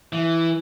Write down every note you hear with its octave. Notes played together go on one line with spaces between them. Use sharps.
E3